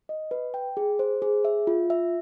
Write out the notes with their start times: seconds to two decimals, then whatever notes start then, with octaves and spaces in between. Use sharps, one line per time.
0.09 D#5
0.31 B4
0.54 G5
0.77 G#4
0.99 C5
1.22 G#4
1.45 E5
1.67 F4
1.90 E5